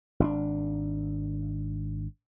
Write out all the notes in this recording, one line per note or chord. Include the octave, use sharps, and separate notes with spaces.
G#1 C#4 D4